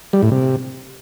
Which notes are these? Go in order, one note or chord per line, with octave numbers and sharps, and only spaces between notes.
G3
A2
C3